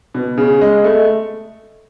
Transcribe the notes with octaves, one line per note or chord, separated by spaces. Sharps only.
B2
C#3
G#3
A3